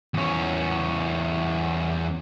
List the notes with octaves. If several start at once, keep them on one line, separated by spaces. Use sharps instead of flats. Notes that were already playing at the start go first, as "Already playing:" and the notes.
E2 C#4